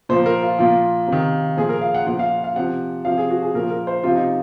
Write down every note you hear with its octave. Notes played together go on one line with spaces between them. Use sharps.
A#2 F3 C5
A#4
F4
A#2 F3 F4
C3 D#3
A#2 F3 G#4
A#4
F5
F#5
A#2 F3 F#5
F5
F5
C3 F3 F#5
C3 F3 F5
G#4
F#4
G#4
A#2 F3 A#4
A#4
C5
C3 F3 F4
D#4